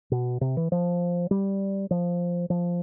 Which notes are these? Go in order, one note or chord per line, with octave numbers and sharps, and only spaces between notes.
B2
C3
E3
F3
G3
F3
F3